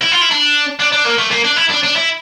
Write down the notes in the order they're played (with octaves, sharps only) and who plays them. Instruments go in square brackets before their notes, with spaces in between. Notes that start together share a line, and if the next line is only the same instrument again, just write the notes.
[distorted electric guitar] E4
F4
E4
D4
D4
D4
A#3
A3
A#3
D4
E4
D4
D4
E4